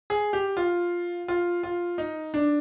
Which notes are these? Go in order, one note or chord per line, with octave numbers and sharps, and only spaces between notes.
G#4
G4
F4
F4
F4
D#4
D4